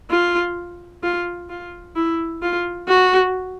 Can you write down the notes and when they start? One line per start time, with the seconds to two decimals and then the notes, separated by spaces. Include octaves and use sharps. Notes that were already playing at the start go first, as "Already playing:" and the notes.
0.11 F4
1.03 F4
1.49 F4
1.96 E4
2.42 F4
2.88 F#4